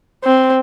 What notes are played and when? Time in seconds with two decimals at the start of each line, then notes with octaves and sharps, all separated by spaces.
0.24 C4